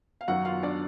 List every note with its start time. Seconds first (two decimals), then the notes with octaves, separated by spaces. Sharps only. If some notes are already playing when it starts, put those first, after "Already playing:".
0.21 F5
0.28 F#2 D#3 F#3 F#4 F#5
0.45 F4 F5
0.63 D4 D5